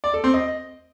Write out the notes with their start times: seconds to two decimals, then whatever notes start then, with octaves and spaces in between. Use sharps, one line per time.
0.04 D5
0.14 A4
0.24 C4
0.34 D#5